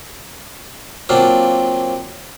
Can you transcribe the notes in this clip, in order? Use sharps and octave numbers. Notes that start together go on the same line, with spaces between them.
F#3 A#3 C4 D4 F4